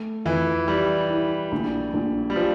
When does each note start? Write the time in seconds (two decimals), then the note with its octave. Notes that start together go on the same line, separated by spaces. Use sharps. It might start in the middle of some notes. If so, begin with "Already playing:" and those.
Already playing: A3
0.25 F2 E3
0.68 G3 E4
1.10 E4
1.52 A#1
1.94 A#1
2.30 G3
2.36 F3